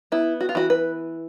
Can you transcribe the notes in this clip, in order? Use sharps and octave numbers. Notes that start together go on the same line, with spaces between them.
B3 E4
F#4
F4
E3 F#4
B4